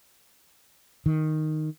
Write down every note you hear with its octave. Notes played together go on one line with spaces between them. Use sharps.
D#3